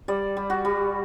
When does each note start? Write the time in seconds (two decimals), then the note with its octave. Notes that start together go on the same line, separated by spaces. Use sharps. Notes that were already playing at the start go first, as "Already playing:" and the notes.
0.08 G3 D5
0.37 G3
0.50 F#4
0.65 G3